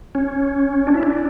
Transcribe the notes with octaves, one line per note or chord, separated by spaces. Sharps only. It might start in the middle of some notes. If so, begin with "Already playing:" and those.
C#4
D4
E4
D4